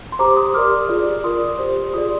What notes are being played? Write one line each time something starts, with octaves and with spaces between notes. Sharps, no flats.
C6
G4 C5 A#5 D6
C6 D#6
G4 A#4 D5 D6 F6
F4 G#4 D5
F4 A#4 D5 C6 D#6
G4 C5
F4 G#4 D5 C6 D#6